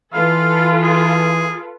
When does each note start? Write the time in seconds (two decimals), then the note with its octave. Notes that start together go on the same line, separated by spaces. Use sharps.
0.14 E3 F4 A4 B4 F5
0.83 G#4